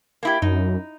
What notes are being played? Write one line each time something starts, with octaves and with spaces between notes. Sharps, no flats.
A#3 E4 G4
F#2 D#4